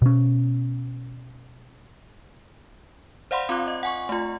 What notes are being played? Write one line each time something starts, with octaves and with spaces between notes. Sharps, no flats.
B2 C#4
C5 D5 F5 F#5 B5 C6
C4 F4 D6 F#6
D#5
F#5 G#5 C#6
A3 F4